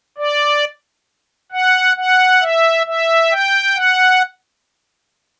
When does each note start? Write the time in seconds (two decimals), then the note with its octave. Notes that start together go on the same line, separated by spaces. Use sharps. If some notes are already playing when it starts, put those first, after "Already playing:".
0.18 D5
1.52 F#5
1.97 F#5
2.41 E5
2.86 E5
3.30 G5
3.75 F#5